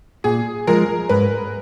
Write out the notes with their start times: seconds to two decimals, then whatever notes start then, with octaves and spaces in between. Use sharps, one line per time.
0.24 A#2 G#4
0.67 F3 G#3 A#4
1.09 G#2 B4